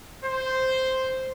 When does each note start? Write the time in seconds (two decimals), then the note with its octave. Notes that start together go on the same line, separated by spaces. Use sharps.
0.23 C5